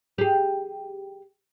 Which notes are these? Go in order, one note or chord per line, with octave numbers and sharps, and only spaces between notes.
G4 G#4